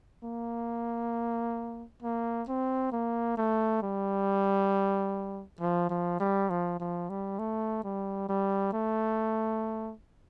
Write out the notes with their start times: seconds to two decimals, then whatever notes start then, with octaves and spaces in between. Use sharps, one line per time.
0.24 A#3
2.03 A#3
2.48 C4
2.92 A#3
3.38 A3
3.82 G3
5.61 F3
5.90 F3
6.20 G3
6.50 F3
6.80 F3
7.10 G3
7.39 A3
7.84 G3
8.29 G3
8.73 A3